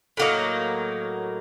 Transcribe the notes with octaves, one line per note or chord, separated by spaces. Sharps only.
A2 F#3 A#3 D#4